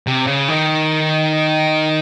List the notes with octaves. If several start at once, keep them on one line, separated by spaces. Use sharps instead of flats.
C3
C#3
D#3